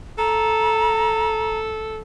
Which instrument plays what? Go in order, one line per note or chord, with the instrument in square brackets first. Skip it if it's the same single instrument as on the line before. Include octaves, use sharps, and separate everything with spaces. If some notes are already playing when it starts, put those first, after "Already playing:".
[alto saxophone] A4 [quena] A#5